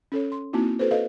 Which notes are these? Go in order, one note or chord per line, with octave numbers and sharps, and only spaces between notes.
C#4 A4 C#5
C6
A#3 C4 D#4 E4 F#4
F#4 A4 B4 C5
A4 B4 C5 D#5 F5